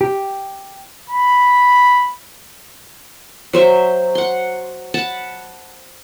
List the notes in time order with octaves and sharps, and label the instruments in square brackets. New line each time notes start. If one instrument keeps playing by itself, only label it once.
[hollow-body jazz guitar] G4
[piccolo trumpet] B5
[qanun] F#3 C5 E5
F#5 C6
F#5 A5 B5